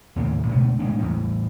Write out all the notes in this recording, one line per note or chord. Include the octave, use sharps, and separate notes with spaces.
D#2 A2 C#3 A#3
B2 D3 G#3 A3
A2 G#3 A#3 D4
E2 A2